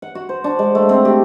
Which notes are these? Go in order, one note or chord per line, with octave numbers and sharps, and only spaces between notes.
F#5
F#4
C5
D4
G#3
A3
C4
G4